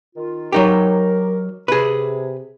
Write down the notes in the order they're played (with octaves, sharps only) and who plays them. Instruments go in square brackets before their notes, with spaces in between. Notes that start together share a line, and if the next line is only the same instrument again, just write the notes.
[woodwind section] D#3 F4
[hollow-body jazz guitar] F#3 D#4 G4 [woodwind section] A#4
[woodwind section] C3 [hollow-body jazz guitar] G#4 B4